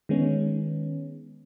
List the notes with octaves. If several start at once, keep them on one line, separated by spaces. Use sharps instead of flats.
D#3 G#3 B3 C#4